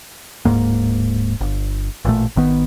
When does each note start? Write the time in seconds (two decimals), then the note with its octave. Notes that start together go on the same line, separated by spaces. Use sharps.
0.45 D1 F2 G#2 A#3
1.41 G1
2.05 A1 A#2 D3 A3
2.36 G#1 D#3 B3